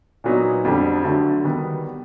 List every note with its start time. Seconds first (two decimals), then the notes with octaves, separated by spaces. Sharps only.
0.24 A#2 F#3 B3 D#4
0.65 F2 D3 G3 C4
1.04 D3 F#3 A3
1.44 D#3 G3 B3